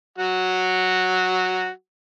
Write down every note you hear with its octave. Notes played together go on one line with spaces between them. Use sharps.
F#3 F#4